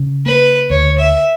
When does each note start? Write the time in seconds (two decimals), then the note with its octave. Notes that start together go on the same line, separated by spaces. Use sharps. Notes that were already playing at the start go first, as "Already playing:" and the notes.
Already playing: C#3
0.26 A#3 B4
0.70 D2 C#5
0.99 E5